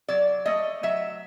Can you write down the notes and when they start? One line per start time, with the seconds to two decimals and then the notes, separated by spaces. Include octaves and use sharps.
0.08 F#3 D5
0.46 A3 D#5
0.83 F#3 E5